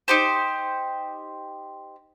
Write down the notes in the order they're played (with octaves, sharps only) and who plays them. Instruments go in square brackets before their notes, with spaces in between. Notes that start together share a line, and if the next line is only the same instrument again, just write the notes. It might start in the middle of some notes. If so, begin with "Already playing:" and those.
[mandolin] D#4 G4 C5